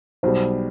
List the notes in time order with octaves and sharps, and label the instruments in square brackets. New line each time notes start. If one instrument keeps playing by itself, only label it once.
[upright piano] B1 B2 G3 [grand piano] C5